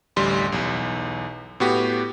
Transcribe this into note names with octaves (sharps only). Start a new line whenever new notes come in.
A1 D2 G3 C6
B1 E2
A2 B3 F#4 G4